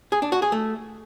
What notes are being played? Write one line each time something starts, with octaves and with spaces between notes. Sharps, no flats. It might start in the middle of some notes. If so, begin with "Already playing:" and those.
G#4
D4
F#4
G#4
A3